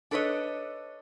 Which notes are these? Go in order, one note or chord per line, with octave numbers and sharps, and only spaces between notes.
D4 A4 B4 C#5 D#5